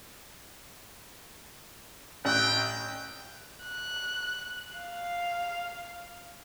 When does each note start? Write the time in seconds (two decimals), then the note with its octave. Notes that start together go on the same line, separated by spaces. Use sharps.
2.25 A1 G5 F#6
3.63 F#6
4.77 F5